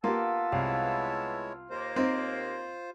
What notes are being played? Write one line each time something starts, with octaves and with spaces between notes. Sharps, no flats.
A#3 B3 F4 G4 A5 E6
C2 G#3 E4 C#5 F5
D#2 A#3 F4 C5
C4 D#4